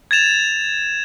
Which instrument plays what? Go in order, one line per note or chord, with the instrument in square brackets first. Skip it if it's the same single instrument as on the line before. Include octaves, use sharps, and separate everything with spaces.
[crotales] G#6 A6 E7 F7